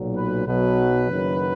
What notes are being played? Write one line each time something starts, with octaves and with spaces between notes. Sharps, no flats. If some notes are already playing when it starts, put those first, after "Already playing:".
Already playing: B1 A#2 F#3
B4
B1 B2 F#3 B4
F#1 F#2 D#3 F#3